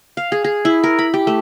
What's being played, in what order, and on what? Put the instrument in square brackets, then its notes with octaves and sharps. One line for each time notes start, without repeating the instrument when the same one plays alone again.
[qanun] F5
G#4
G#4
E4
A#4
B5
G4
A3